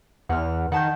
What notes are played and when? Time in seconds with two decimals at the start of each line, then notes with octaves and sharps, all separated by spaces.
0.29 E2 F#5 F6
0.72 D#3 F#5 A5 G6